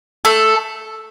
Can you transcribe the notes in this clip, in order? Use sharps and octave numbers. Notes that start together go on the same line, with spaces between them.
A3 A4